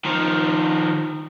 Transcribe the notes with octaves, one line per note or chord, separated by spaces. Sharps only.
D#3 F3